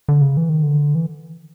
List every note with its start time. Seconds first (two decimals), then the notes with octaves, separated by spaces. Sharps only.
0.09 D3
0.21 C#3
0.37 E3
0.49 D#3
0.63 D3
0.95 E3